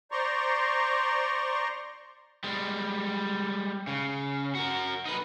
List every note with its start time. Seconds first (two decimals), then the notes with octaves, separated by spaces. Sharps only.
0.12 C5 D5 A#5 C6 C#6
2.44 G3 G#3
3.87 C#3
4.55 F#4 A#4
5.05 D#4 B4